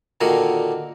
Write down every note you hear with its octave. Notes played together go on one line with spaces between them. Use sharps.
A#2 D3 D#3 F#4 G#4